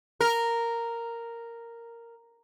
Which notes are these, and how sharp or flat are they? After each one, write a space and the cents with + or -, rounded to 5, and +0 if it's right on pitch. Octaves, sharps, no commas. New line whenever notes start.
A#4 -5